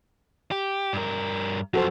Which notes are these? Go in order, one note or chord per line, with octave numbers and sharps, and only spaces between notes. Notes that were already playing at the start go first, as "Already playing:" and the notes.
G4
G2 A#4
F#2 F3 F#4 A4 C5